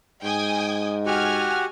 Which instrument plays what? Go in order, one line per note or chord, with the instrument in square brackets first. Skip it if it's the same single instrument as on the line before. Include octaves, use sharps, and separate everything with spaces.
[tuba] G#2 [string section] G5 G#5 D#6
[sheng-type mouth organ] F#4 G4 F#5 [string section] G#5 F6